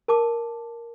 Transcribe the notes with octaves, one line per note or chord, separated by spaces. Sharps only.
A#4 A5 D6